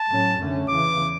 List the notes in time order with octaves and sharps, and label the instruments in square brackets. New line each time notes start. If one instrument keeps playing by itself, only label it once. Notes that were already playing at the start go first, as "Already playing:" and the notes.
Already playing: [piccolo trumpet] A5
[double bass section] A2 F#3 C#4
F#2 D3 A3 C#4
[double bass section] E2 C#3 E3 [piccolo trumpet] D6